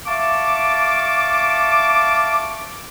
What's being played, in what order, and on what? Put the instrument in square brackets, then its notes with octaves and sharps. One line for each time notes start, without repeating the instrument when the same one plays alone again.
[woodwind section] E5 F5 A5 C#6 D6